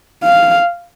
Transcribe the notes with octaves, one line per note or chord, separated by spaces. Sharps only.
F5